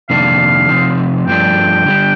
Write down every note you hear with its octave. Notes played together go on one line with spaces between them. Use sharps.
F2 C3 D#3 A#3 D4 F5
C3 F3 C4 D#4
G2 F3 A3 D4 G5
D3 G3 D4